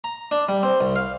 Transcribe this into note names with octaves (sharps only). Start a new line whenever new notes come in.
A#5
D4
G3
C4
C2
F5